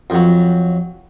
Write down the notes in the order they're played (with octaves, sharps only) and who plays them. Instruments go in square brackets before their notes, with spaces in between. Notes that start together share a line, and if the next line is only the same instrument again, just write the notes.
[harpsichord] F2 F#3